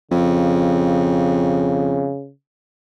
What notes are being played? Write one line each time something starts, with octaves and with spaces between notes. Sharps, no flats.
F2 C#3